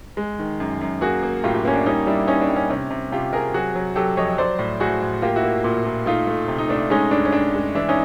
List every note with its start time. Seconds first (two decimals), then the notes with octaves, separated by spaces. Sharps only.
0.17 G#3
0.39 D#3
0.60 F#2
0.81 F#2
1.01 A#3 F#4 G#4
1.23 A#3
1.44 A2 F4 G4
1.54 F4 G4
1.65 A#3 C#4
1.76 D4
1.86 G3 C#4 D#4
2.06 G3 D4 E4
2.27 A#3 C#4 D#4
2.41 D4
2.50 G3
2.56 C#4
2.69 C3 C#4
2.91 C3
3.12 C3 F4 G4
3.33 C3 G#4 A#4
3.54 F#3 F#4 G#4
3.75 F#3
3.96 F#3 G4 A4
4.17 F2 C#5 D#5
4.38 F#3 C5 D5
4.59 A2
4.80 A2 F#4 G#4
5.02 A2
5.22 A#3 F4 G4
5.36 E4 F#4
5.43 A#3
5.64 A#2
5.85 A#2
6.06 A3 D#4 F4
6.27 A3
6.48 C3
6.58 D#4
6.69 A3 D4
6.90 G#3 C#4 D#4
7.11 G2 D4
7.25 C#4
7.32 G2 D4
7.54 G#3
7.75 E3 D4 E4
7.89 C#4 D#4